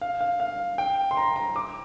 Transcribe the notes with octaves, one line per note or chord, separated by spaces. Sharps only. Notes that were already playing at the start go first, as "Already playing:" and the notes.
F5
F5
F5
G5
C6
A#5
A#5
D6